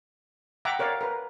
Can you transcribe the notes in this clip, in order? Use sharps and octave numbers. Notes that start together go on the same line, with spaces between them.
E5 F#5 G5 A#5 D6
A#4 C#5 D5 F5
A#4 B4